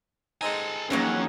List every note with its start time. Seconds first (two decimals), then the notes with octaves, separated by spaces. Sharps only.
0.41 G#3 C4 D#4 A4 G#5
0.90 F2 E3 F#3 G#3 A#3 C#4 D#4